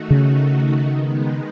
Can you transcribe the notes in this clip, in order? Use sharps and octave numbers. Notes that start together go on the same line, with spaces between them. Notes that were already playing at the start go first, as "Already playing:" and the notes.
Already playing: D#3 A3 D#4 F#4
C#3
D#3 G#3 B3 D#4